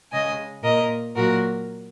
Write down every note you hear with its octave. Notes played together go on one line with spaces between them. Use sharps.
C#3 G#3 D#5 G#5
A#2 A#3 A#4 D#5
A#2 F#3 A#3 F#4 A#4